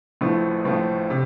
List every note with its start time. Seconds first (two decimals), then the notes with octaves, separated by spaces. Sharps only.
0.21 A1 A2 F3 A3
0.64 A1 A2 F3 A3
1.10 C3